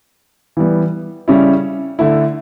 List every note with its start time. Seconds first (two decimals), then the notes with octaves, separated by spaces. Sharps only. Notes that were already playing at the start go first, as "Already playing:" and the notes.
0.57 E3 G3 B3
1.28 C#3 G3 C#4 E4
1.99 D3 A3 E4